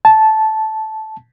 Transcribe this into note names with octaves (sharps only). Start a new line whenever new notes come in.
A5